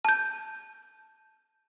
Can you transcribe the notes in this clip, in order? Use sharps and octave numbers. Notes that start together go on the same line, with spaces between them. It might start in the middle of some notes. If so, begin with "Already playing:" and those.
A5 G6